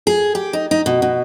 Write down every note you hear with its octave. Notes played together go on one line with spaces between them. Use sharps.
G#4
G4
D#4
D#4
B2
B2